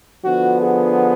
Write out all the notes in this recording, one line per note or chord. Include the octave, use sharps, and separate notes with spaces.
D3 F3 B3 F#4
G#4